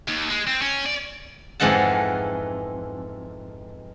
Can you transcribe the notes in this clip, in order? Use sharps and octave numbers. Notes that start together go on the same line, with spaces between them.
D#2
G#3
C4
C#4
D5
F2 G#2 E3 G#3 F#5 A5